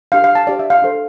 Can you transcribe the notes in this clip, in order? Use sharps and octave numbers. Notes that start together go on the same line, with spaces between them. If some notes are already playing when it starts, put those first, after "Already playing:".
D4 G4 A#4 F5
F5
A5
D4 G4 C5 D5
E5
F5
D4 A4 C5